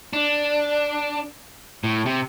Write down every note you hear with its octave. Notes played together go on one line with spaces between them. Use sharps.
D4
A2
C3